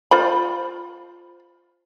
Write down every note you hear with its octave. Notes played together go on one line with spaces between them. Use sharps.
F4 C5 B5